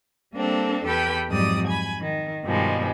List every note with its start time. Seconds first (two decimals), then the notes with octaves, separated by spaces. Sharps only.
0.35 G3 A#3 C4 D4 A4
0.85 E2 G4 A4 B4 G5 B5
1.29 F2 G#2 F#3 G3 D5 D#6
1.67 G#5 B5
2.01 D#3
2.44 G2 B2 D#3 F3 G3 G#3